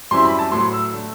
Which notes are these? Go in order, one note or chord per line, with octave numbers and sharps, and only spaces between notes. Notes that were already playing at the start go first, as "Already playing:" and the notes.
F#2 E3 G3 C4 E4 C6
B5
A5
A2 F#3 B3 C6
E6
D3 A3